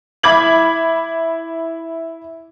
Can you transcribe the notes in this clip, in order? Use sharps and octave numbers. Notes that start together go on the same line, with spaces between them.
E4 B5 D6 G#6 F#7